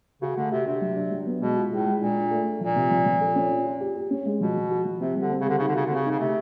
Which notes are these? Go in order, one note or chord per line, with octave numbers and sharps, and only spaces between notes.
C#3 F#4
D3 A3
C3 F#4
C3 D4
F#3
D4
F#3
B3
B2 G#3
F4
A2 G#3
G#3
A#2 D4
D4
A3
D4
A#2 F3
C3
F3
F3
A4
C#4
F4
F4
G4
G4
C#4
G#3
B2 F3
F3
F#4
F3
C3 C4
G3
D3
C4
C#3
D3 G3
C#3 D#4
D3
C#3 F#4
D3 C4
C#3
D#4
C#3
C3 A3